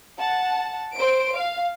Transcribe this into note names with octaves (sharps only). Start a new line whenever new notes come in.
F#5 A5
C5 D7
F5